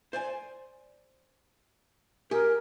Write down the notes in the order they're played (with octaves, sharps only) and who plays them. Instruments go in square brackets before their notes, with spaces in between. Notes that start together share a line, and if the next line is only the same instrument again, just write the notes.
[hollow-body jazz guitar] C5 D5 G#5
[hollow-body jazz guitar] G4 G#4 [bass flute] A#4